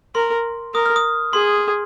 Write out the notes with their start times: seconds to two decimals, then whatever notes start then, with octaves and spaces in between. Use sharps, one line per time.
0.15 A#4 C6
0.74 A#4 D#6
0.86 F6
0.96 D#6
1.33 G#4 C6